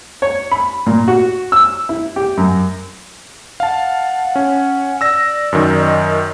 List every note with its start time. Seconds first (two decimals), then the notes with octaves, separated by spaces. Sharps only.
0.22 C#5
0.52 B5
0.86 A#2
1.08 F#4
1.52 E6
1.89 E4
2.16 G4
2.37 F#2
3.60 F5 F#5 A5
4.36 C#4
5.01 D5 E6 A#6
5.52 F#2 D#3
5.78 D#5